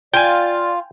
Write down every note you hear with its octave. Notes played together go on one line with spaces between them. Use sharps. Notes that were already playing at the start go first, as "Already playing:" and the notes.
F4 D5 G5 G#5